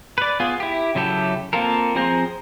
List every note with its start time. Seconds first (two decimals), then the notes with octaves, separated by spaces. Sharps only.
0.18 B4 D5
0.40 B3 F4 G#4
0.60 E4 G4
0.95 C#3 F#3 E4 G4 A4
1.53 A#3 C4 F4 A4 A#4
1.95 F3 C4 G#4 C5 A#5